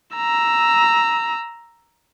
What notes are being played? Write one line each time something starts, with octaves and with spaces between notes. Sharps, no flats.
A#5 E6